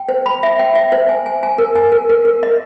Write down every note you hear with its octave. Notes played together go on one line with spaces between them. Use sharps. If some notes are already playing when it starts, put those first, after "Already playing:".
Already playing: G5
C5
B5
E5
G5
E5
C5
G#5
G#5
G#5
A#4
G#5
A#4
A#4
A#4
D#5